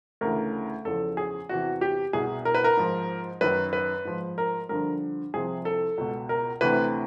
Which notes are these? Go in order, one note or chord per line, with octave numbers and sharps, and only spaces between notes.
D2 C#3 E3 A#4
E2 C#3 F3 A4
G#4
E2 C3 E3 F#4
G4
C2 B2 G#4
A#4
B4
A#4
G#2 F3
F#2 D#3 B4
B4
G#2 F3
A#4
G2 D3 F3 A#4
C2 C3 F3 G#4
A4
C#2 B2
A#4
D2 C3 E3 B4